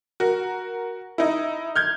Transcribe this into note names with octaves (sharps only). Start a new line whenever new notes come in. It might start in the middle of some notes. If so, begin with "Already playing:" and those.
F#4 A#4
D#4 E4
F6 G6 G#6